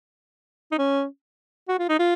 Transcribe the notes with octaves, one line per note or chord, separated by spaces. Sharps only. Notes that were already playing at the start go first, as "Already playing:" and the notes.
D#4
C#4
F#4
F4
D#4
F4